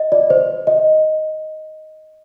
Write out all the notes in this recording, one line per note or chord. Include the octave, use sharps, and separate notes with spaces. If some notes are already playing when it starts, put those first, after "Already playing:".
Already playing: D#5
D5
C5
D#5